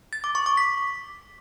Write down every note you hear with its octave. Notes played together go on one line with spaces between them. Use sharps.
A6
D6
C#6
D6
B6